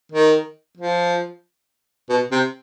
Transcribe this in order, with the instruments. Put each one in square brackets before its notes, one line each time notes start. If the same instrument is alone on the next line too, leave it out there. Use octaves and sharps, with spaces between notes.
[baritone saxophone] D#3
F3
B2
C3